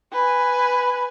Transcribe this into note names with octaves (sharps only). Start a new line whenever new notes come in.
B4 G#5